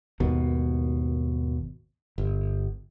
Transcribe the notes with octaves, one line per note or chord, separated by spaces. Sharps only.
G#1 D#2 B2
G1